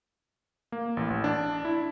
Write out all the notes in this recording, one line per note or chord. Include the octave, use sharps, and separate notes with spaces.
A#3
A1
A1
D4
E4